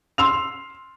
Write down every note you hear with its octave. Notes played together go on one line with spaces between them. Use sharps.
C6 E6 F7